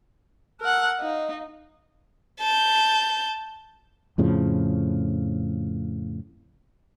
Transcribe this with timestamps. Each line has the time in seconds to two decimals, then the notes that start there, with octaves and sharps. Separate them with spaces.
0.60 A#4 F#5 A5 E6 F#6
1.00 D#4 D#5 F5
2.40 A5 G6
4.18 F2 A2 C#3 F3